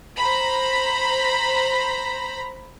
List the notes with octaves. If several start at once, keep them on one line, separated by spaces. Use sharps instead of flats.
C5 A#5 B5